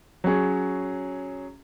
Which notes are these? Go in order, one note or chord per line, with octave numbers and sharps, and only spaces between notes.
F#3 C#4 G#4